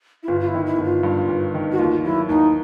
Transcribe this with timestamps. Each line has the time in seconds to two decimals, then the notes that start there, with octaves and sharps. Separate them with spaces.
0.23 E4
0.28 G1 F4
0.41 F4
0.48 E4
0.54 D#3
0.66 E4
0.79 G1
0.84 F4
1.03 G2
1.28 G1
1.54 D#3
1.72 F#4
1.79 D#2 F4
2.04 F#3 E4
2.29 D#2 D#4